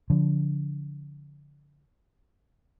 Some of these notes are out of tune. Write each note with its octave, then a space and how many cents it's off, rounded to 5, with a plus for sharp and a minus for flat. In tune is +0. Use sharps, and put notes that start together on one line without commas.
D3 -30 F3 +0